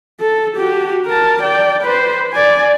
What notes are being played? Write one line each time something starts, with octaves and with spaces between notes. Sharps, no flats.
A4
F#4 G4
A#4 A5
D5 G5
B4 C5
D5 G#5